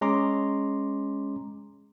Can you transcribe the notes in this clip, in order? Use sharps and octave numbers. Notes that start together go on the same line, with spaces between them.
G#3 C#4 A#5 C6 D6